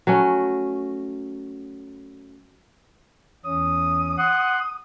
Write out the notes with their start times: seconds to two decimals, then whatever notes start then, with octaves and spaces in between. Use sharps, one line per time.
0.07 F#3 A3 C#4
3.45 E2 C#4 D#6
4.18 F#5 C6 F#6